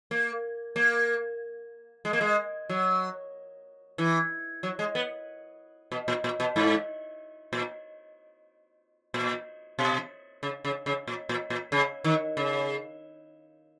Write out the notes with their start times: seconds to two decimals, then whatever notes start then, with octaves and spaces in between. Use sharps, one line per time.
0.11 A#3
0.76 A#3
2.05 G#3
2.13 A#3
2.21 G#3
2.69 F#3
3.98 E3
4.63 F#3
4.79 G#3
4.95 B3
5.92 B2
6.08 A#2
6.24 A#2
6.40 B2
6.56 G#2
7.53 A#2
9.14 A#2
9.79 B2
10.43 C#3
10.65 C#3
10.86 C#3
11.08 A#2
11.29 A#2
11.50 A#2
11.72 C#3
12.04 D#3
12.37 C#3